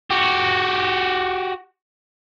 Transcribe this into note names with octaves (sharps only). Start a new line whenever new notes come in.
F#4 G4